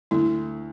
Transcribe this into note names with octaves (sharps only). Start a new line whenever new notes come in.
D2 E4